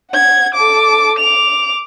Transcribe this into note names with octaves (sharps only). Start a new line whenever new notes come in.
F#5 G#6
A4 D6
D6 F7